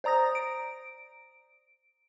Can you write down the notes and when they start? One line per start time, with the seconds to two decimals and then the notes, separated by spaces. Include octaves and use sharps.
0.04 C5 D5 A#5 D#6 A#6
0.35 D7